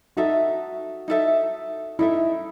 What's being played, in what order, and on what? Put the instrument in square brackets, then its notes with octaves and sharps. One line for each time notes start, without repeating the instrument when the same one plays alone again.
[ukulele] D#4 A4 E5 [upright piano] F#4
[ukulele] D#4 A4 E5
[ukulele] D#4 A4 E5 [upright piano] E4